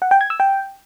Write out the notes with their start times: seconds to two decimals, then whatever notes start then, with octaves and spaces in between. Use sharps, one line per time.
0.02 F#5
0.11 G5
0.21 G#6
0.30 E6
0.40 G5